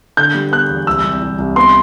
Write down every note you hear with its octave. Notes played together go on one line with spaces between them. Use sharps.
D3 G6
G3
B3 F#6
E2
C2 E6
C2
C2
C2
B3 C6